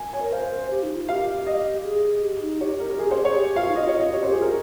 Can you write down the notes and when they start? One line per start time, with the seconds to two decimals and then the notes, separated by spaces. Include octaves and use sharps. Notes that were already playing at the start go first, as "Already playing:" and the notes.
Already playing: G#5
0.13 C#5 G#5
0.22 A#4
0.32 C5 F5
0.71 G4
0.83 D#4
0.96 F4
1.09 G4 F5
1.47 D#5
1.84 G#4
2.22 G4
2.42 D#4
2.61 G4 C#5
2.80 A#4
2.91 A#4
2.99 G#4
3.11 C5
3.25 G#4 C#5
3.37 G4
3.56 F4 F5
3.69 D#4
3.75 F4 D#5
3.87 G4 C#5
3.94 F4
4.00 D#5
4.13 G4 C#5
4.23 C5
4.26 G4
4.32 G#4
4.38 F4 A#4